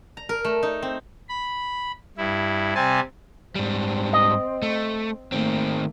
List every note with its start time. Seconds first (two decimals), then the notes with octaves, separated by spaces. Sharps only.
0.17 A#5
0.29 A#4
0.45 A3
0.63 D#4
0.82 C4
1.29 B5
2.18 G2 E4
2.75 C3 G3 C4 G#5 A5
3.55 G#2 G3 C4
4.13 D#5
4.62 A3
5.32 D#3 A3 A#3 C4